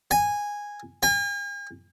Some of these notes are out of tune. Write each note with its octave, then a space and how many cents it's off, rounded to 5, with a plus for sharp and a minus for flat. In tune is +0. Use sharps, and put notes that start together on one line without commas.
G#5 -10
G#5 -45